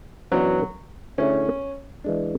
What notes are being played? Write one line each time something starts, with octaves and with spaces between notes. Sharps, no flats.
F#2 E3 F#3 B3 D4 F#4
D3 A3 C#4 E4 G#4 C#5
E3 G#3 D4